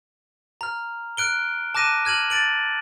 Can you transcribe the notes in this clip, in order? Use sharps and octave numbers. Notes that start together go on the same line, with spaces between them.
A#5 F6
F6 F#6 D7 G7
A5 D6 F#6 A#6 D#7 E7
F6 G#6 D#7 F#7
A6 D7 F#7